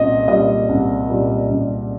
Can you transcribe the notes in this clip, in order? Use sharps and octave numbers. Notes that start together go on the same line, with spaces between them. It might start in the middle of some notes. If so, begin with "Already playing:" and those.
Already playing: C2 A#2 G3 D#5
A#2 G3 D#5
C2
A#2 G3
C2